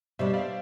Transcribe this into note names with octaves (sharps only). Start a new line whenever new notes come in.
B2 G3 D4 C5 E5
D5 F5